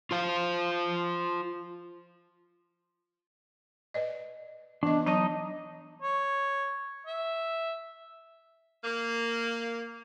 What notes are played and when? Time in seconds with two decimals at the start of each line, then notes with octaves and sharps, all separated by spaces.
0.11 F4 C5 F5
3.94 B4 D5 D#5
4.83 E3 B3 D4 D#5
5.06 F#3 D#4 D#5 A5 C#6
6.02 C#5
7.06 E5
8.84 A#3